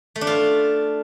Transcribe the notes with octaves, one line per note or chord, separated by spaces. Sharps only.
A3
D4
F4